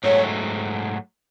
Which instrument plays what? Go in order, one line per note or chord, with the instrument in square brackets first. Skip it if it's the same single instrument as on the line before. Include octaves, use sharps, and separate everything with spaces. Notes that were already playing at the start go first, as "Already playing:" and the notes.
[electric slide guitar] G#2 F#3 A3 [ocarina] C#5